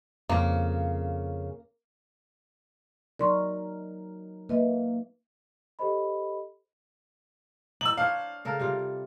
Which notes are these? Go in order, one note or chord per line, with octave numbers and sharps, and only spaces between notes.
F2 C#3 A#3
F#3 D#4 A#4 D5 C6 C#6
A#3 B4 D#5 E5
G4 A4 C5 D#5 B5
D#4 E6 F#7
D4 C5 C#5 F5
C#3 A4 A#4
C3 G3 F4